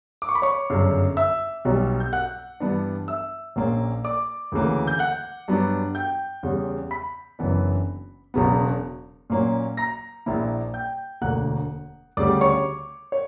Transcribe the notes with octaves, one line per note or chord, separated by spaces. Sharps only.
D6
C#6
B5
C#5 C#6
G1 F#2 C#3
E5 E6
B1 B2 G3
G6
F#5 F#6
G2 E3 B3 D4
E5 E6
A#1 A#2 A#3 C#4
D5 D6
D2 C#3 E3 A#3
G6
F#5 F#6
G2 F#3 B3 D4
G5 G6
E2 C#3 G3
B5 B6
F#1 F#2 E3 B3 D4
E1 E2 C#3 F#3 B3
A#2 F#3 A#3 C#4
A#5 A#6
A#1 A#2 A#3 E4
G5 G6
E1 D2 D3 A#3 F#5 F#6
D2 C#3 G3 D5 D6
C#5 C#6
C#5